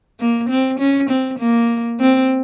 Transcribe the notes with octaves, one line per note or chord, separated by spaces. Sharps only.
A#3
C4
C#4
C4
A#3
C4